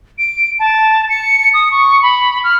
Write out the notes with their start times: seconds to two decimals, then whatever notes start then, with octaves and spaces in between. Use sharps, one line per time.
0.18 D7
0.59 A5
1.09 C#7
1.54 D#6
1.72 C#6
2.03 B5
2.44 F6